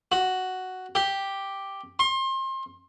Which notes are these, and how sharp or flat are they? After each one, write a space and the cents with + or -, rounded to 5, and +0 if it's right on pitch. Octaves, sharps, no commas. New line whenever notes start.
F#4 +5
G4 +0
C6 +30